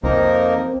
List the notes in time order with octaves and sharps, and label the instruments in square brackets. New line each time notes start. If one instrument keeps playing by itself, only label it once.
[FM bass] C2 [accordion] F2 F3 A#3 [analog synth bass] C4 [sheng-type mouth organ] D#4 A#4